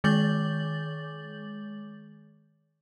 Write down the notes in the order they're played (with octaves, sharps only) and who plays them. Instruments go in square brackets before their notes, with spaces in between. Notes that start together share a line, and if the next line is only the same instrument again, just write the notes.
[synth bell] D#3 G#3 D6 G6 A6 F#7